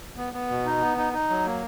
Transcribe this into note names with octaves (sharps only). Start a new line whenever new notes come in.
B3
B3
B2
D#4
B3
D#4
D#4
F#3
A#3